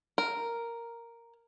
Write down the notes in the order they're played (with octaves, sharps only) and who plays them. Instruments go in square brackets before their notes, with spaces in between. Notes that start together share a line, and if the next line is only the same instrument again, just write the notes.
[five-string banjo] A#4